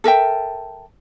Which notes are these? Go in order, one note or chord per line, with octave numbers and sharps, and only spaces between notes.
A4 A#4 E5 G5